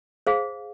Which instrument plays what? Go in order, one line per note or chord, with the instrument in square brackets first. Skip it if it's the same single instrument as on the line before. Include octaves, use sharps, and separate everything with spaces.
[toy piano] G#4 C5 F5